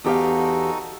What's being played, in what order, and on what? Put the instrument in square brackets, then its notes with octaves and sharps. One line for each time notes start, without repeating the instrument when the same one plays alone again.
[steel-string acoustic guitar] E2 G4 F5 [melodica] D#4 F#4 A4